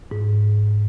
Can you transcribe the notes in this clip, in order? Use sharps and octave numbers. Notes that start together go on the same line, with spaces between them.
G#2